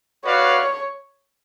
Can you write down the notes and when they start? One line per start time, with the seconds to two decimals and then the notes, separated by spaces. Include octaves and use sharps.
0.25 F#4 B4 C#5 D5 F5